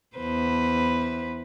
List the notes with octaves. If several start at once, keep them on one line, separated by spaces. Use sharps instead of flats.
E2 B4 C5